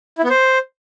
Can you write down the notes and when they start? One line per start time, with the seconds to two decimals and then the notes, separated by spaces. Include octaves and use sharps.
0.18 E4
0.24 B3
0.30 C5